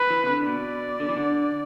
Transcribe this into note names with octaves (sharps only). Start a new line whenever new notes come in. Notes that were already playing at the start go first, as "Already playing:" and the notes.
Already playing: B4
E3
C3
D3
B2 D5
D3
E3
D3